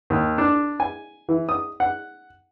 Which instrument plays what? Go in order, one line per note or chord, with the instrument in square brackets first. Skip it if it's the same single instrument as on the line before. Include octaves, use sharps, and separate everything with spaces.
[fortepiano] D#2
D4
G#5
E3
D#6
F#5